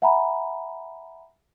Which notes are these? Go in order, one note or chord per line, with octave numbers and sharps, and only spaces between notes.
E5 F#5 G#5 A#5 B5